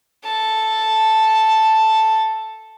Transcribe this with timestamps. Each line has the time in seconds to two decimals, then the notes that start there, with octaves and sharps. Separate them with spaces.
0.24 A4 A5